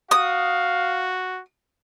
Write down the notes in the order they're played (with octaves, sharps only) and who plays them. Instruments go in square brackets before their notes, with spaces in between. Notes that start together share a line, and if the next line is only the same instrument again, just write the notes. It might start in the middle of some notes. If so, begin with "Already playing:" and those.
[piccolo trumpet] F#4 [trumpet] F5 [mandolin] D#6